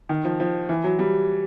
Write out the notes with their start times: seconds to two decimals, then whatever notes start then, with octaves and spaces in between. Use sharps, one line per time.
0.09 D#3
0.25 F3
0.40 F3
0.69 E3
0.84 F#3
0.99 G3